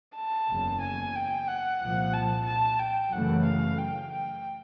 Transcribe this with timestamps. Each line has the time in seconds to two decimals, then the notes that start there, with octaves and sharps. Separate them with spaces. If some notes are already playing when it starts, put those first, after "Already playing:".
0.16 A5
0.49 F#1 E2 C#3
0.82 G#5
1.15 G5
1.48 F#5
1.81 C2 A#2 F3
2.14 A5
2.46 A5
2.79 G5
3.12 F#2 C#3 E3 A3 F#5
3.46 F5
3.78 G5
4.11 G5